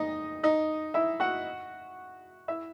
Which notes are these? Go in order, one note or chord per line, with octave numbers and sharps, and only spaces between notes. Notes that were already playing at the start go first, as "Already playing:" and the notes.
Already playing: D#4 D#5
D#4 D#5
E4 E5
F#4 F#5
E4 E5